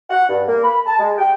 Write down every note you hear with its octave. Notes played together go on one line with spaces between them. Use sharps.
F#5
G2
A#3
B5
A5
G#3
G5